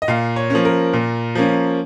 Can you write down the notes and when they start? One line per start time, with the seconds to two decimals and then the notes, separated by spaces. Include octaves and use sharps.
0.02 D#5
0.08 A#2 F5
0.36 C#5
0.50 F3 A#3 C#4
0.65 A#4
0.93 A#2
1.35 F3 A#3 C#4